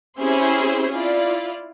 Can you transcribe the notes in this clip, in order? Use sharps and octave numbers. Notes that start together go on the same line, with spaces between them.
C4 C#4 E4 G4 G#4 C5
E4 F4 D5